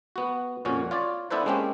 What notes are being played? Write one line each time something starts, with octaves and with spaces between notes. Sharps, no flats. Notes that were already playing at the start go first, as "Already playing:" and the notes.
B3 F#4
F2 A#2 C#4 F#4
F4 C#5 D5
B3 D4 E4 A4 B4 C5
G#3 A#3 C4 C#4 G4